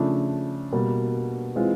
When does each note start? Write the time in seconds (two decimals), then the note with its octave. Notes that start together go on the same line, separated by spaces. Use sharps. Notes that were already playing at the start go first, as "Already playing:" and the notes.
Already playing: C#3 F3 A3 D4
0.72 B2 G3 A#3
1.55 E3 G#3 C4 F4